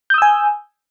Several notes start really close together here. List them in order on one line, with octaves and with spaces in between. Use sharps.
G6 D#6 E6 G#5